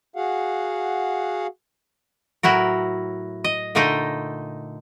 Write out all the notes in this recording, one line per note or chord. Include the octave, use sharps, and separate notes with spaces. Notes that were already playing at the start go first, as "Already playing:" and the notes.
F#4 G#4 F5 F#5
A2 F#3 E4 F#4 A#4
D#5
A#2 D3 A3 D#4 D#5 G5